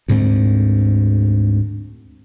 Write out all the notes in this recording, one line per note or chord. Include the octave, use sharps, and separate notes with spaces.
D2 G#2 D3 C4